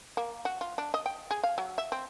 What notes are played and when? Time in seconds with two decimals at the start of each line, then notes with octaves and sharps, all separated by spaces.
0.17 A#3
0.45 F#4
0.61 F4
0.78 D4
0.94 D#5
1.06 G5
1.31 G#4
1.44 F5
1.58 F#3
1.78 E5
1.92 C4